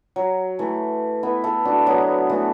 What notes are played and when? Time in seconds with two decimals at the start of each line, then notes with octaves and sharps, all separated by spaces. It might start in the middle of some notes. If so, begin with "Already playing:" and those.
0.16 F#3
0.59 E3 A3
1.23 B3 E4
1.44 E4 A4
1.65 D4 F#4
1.86 F#3 B3
2.30 E3 A3